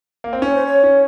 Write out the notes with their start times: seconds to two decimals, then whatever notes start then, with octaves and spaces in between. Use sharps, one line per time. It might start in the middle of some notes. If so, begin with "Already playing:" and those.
0.24 A#3
0.33 C4
0.42 C#4 C#5
0.54 C5
0.66 C#5
0.84 C#4